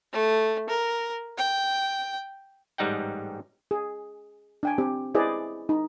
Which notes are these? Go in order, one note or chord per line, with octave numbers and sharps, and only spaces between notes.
A3
A#4
G5
A1 G#2 G3 D#4 F#5 G5
G#4
D4 G5 G#5
C4 G4
E4 G#4 B4 C5 D5 D#5
D#4